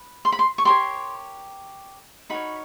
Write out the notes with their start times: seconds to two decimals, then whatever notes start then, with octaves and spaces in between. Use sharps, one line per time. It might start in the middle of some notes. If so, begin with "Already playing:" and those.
Already playing: B4
0.25 C6
0.32 B5
0.39 C6
0.58 C#6
0.65 G4 A#4 C#5 C6
2.30 D#4 F#4 A#4 C#5 B5